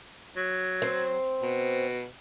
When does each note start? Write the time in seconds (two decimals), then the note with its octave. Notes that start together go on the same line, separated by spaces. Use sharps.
0.36 F#3
0.82 C4 C5
1.43 B2